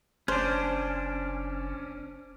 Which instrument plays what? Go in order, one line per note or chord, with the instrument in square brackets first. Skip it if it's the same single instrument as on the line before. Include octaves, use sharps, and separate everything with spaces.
[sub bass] F#1 [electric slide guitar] C#4 D4 [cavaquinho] C5